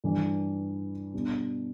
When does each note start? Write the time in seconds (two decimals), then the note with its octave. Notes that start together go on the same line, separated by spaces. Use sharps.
0.04 G2 E3 G3
1.14 B2 G3 D4